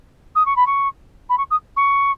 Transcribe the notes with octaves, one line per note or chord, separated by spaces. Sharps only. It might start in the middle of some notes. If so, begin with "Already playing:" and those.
D#6
C#6
B5
C#6
B5
C#6
D#6
C#6